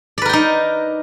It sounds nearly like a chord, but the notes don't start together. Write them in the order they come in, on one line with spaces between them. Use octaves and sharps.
D5 B4 A#4 G5 D#4